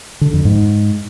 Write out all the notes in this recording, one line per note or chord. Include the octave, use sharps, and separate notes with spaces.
D3
F2
G#2